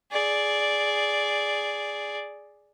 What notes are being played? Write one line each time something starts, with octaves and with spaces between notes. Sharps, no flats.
G#4 D5